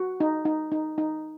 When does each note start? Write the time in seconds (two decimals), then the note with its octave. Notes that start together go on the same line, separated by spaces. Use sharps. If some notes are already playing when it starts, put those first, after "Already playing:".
Already playing: F#4 F#5
0.20 D#4
0.45 D#4
0.72 D#4
0.98 D#4